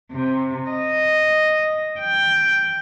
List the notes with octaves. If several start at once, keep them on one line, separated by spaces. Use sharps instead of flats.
C3
D#5
G5